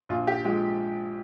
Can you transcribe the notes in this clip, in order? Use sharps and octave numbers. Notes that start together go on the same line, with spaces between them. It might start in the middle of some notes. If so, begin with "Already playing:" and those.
A#1 F4
G4
F3 G#3 G4